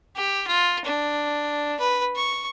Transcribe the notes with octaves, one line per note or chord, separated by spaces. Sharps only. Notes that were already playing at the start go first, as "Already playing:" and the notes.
G4
F4
D4
B4
C#6